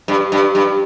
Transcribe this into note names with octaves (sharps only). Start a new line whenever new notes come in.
G2
G2
G2